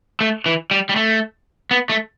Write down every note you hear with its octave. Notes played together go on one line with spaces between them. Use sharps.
A3
E3
G3
G3
A3
B3
A3